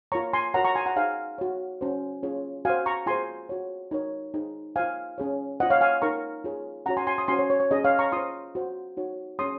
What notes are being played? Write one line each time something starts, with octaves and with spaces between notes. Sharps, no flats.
F4 A#4 C#5 A#5 C#6
G#5 C6
F#4 A#4 C#5 F#5 A#5
A#5 C#6
G#5 C6
F#5 A#5
D#4 G#4 C5 F5 G#5
F#4 C#5
C#4 F#4 C5
C#4 F4 G#4 C#5
F#4 C5 F5 G#5
A#5 C#6
F4 G#4 C5 G#5 C6
F#4 C#5
D#4 A#4 C#5
D#4 G#4 C5
F4 C5 F5 G#5
C#4 G#4 C#5
F4 C5 D#5 F#5
C#5 F5
F5 G#5
D#4 A#4 C#5 A#5 C#6
F4 G#4 C#5
C#4 F#4 C#5 F#5 A#5
G#5 C6
G#5 C6
C6 D#6
C#4 F#4 C5 G#5 C6
C#5
C#5
C#5
C#4 G#4 C#5 D#5
C#5 F5
A#5 C#6
F4 C5 C6 D#6
F#4 C5
D#4 F#4 C#5
C#4 G#4 C#5 C6 D#6